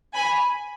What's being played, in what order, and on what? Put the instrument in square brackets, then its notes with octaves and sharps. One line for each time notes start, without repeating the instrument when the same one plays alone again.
[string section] G#5 B5